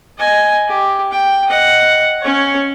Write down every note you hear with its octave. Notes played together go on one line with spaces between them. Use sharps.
D#5 G#5
G4
G5
D#5 F#5
C#4 C#5